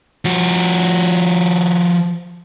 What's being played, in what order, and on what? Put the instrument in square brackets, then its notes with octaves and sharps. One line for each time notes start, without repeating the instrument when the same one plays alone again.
[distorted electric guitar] F3 F#4